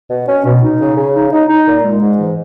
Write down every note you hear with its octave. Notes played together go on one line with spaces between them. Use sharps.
B2
C#4
B2
D#4
C#3
C#3
D#4
D#4
D#4
A#2
G#3
G#2
E3